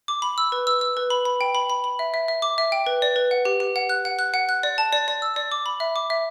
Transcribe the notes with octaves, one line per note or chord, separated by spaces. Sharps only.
D6
B5
E6
B4
E6
E6
B4
B5
B5
G5
B5
B5
B5
E5
E5
E5
D6
E5
G5
B4
D5
B4
F#5
G4
G4
F#5
F#6
F#5
F#6
F#5
F#6
D5
A5
D5
D5
E6
D5
D6
B5
E5
D6
E5